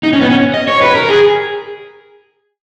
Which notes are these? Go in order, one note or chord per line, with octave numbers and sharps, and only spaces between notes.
D#4
C#4
B3
C#4
D#5
C#5
B4
A#4
G#4